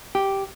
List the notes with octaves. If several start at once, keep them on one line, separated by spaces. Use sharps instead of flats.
G4